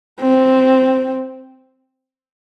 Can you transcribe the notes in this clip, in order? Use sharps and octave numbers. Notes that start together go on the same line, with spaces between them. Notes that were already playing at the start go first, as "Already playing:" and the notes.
C4